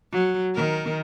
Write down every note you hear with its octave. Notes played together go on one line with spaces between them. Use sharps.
F#3
D#3 A#4